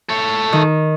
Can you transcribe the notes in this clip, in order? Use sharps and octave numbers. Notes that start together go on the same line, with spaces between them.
A4 C#5
D#3